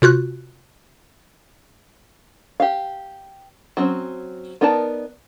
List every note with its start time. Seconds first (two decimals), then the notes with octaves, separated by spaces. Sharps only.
0.02 C3 F4 F#4 F#6
2.60 G4 F5
3.77 F#3 C4 C#4
4.61 B3 D#4 A#4 D5 A5